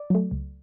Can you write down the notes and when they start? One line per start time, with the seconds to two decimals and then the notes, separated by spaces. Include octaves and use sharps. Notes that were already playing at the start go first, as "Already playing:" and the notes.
Already playing: D5
0.10 F#3 A3
0.31 C#2